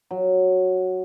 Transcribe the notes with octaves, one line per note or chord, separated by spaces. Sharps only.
F#3